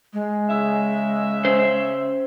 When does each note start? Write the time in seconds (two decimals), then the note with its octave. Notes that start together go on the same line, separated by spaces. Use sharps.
0.13 G#3
0.49 C#3 E5
1.45 C#4 C5